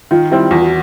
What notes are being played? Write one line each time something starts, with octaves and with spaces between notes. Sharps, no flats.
D#3 F4
G3 C4 E4
E2 F4
F#4